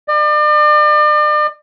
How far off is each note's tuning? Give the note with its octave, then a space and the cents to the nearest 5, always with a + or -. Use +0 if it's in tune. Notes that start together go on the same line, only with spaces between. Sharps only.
D5 +40